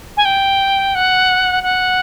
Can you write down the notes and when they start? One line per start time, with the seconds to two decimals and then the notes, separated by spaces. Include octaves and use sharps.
0.17 G#5
0.25 G5
0.95 F#5
1.63 F#5